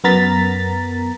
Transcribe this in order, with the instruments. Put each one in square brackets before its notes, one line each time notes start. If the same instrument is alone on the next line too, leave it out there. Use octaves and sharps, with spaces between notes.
[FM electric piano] F#2 B3 A#4 A#5 A6 B6